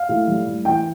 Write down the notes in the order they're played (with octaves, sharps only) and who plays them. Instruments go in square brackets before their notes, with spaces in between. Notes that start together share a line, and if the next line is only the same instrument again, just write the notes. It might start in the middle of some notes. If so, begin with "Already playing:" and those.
Already playing: [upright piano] F5
A2
G3
A2
E3 G5